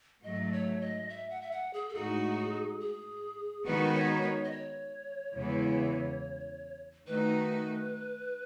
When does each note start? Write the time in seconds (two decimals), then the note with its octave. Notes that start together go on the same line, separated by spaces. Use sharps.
0.24 G#2 F#3 A3 D#5
0.52 C#5
0.81 D#5
1.09 E5
1.30 F#5
1.42 E5
1.51 F#5
1.73 G#4
1.89 A4
1.94 A2 G#3 D#4 F#4 G#4
2.80 G#4
3.65 D#3 G#3 B3 D#4 F#4 B4
3.94 C#5
4.22 C#5
4.44 D#5
4.51 C#5
5.36 E2 C#3 E3 G#3 B3
7.07 D#3 A3 D#4 F#4 B4